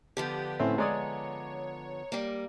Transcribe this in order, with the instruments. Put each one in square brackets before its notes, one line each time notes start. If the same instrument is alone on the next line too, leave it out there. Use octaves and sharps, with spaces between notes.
[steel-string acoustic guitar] D3 F3 B3 [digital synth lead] G4
[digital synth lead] A2 [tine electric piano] A3 C#4 E4 [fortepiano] C4
[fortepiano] G#3 D5 D#6 [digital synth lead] C#5 [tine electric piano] A#5
[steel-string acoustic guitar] G3 A#3